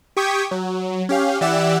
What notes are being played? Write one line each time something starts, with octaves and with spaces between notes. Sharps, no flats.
G4 G5 C#6 D#6 G#6 B6
F#3
C#4 G4 F5
E3 G4 D5 E5 F#5 E7